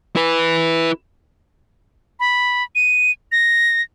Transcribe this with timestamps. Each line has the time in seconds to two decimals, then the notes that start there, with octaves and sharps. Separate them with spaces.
0.16 E4 B4
2.20 B5
2.75 D#7
3.32 A#6